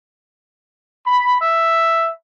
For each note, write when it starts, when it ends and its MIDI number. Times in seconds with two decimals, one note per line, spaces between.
1.06 1.41 83
1.42 2.10 76